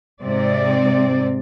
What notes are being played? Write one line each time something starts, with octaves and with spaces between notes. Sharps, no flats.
G#2 C3 C4 D5